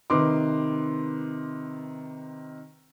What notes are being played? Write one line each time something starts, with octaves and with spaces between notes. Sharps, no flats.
C3 D#3 B4 C6 D6